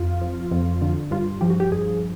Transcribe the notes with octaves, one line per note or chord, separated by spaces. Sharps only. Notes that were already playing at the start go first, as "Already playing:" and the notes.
Already playing: F2 F4
F3
F2
D3
G2 F4
F3 G4
F#4
G4
G2 G#4